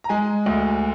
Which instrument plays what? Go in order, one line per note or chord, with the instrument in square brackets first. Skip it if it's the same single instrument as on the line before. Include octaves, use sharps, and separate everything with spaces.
[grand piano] A#5
G#3 G#5
D2